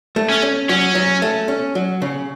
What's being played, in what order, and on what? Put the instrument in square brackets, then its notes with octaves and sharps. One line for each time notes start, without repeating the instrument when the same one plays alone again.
[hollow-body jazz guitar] A3
[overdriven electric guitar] C#4
[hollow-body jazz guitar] C#4
[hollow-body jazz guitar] F#3 [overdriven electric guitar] C#4
[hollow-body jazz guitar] F#3
A3
C#4
F#3
C#3